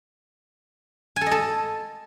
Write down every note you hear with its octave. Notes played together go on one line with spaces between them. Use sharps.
G#5
A4
D#5
A4